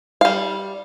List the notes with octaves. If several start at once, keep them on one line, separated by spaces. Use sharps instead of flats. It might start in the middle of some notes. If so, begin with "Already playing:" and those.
G3 F5